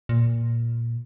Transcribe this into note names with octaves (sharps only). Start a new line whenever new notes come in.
A#2